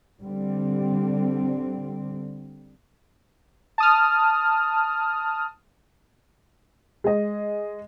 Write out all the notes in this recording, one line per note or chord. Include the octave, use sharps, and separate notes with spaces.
D3 G3 C4
A5 D#6 F6
G#3 D#5